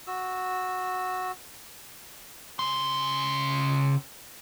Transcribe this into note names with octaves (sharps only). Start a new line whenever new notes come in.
F#4 E6
C#3 C6